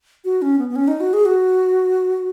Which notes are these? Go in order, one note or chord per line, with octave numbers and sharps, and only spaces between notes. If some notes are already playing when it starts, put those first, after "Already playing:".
F#4
C#4
B3
B3
C#4
D#4
F#4
G#4
F#4